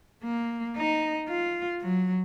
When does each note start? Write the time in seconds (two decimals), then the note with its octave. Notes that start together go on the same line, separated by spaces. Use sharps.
0.23 A#3
0.77 D#4
1.28 F4
1.81 F#3